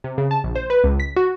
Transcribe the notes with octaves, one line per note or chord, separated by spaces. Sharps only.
C3
C#3
A5
A#1
C5
B4
C#2
B6
F#4